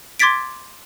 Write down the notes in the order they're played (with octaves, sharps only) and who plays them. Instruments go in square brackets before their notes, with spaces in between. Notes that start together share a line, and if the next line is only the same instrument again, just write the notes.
[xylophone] C6 D6 G#6 A6 B6 D7